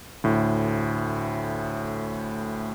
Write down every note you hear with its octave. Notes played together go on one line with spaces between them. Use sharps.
D2 A2